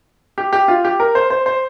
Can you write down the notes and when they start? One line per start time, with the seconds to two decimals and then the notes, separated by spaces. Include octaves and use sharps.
0.38 G4
0.53 G4
0.68 F4
0.84 G4
1.00 A#4
1.15 C5
1.30 C5
1.46 C5